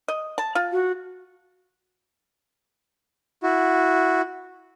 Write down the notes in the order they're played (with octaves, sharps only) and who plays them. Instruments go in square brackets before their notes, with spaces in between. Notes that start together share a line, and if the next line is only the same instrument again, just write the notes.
[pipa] D#5
A5
F4
[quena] F#4
[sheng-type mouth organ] E4 F#4